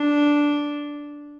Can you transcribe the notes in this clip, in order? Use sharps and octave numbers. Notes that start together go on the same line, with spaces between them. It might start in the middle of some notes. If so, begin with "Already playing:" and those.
Already playing: D4